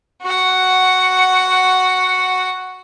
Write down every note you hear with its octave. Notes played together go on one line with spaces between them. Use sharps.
F#4 F#5